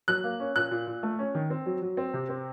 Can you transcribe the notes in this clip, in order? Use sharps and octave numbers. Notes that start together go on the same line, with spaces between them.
F#3 F#6
A#3
C#4
A#2 F#6
A#2
A#2
A3
C#4
D#3
C4
F#3
F#3
C4
C3
C4